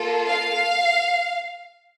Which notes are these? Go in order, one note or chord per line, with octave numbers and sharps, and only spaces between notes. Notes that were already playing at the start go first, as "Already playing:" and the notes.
Already playing: A#3 F4 A4
F5